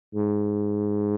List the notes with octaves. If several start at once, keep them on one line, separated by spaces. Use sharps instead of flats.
G#2